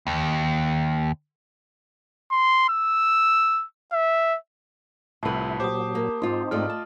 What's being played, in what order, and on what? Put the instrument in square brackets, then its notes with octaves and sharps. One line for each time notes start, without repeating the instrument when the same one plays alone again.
[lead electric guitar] D#2
[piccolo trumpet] C6
E6
E5
[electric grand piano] C2 A2 [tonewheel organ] E4 [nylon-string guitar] F4 B4 [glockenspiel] A5
[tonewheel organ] A#2 F#3 [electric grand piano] G4 C5 [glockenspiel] D6 D#6
[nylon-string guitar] A#3
[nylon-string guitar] G#2 F4 [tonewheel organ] C4 D#4
[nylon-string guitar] G#2 A3 G4 [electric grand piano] F4 D5 D#5 [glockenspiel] F6
[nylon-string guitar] A5